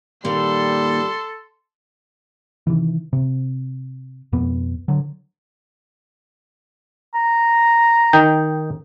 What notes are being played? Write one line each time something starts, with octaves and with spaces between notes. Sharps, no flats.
A#2 D#3 G3 A4 C6
C3 D#3 E3
C3
F2 B2 B3
D3 F#3
A#5
D#3 D#4 G5